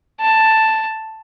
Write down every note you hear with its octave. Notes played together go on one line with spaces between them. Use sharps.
A5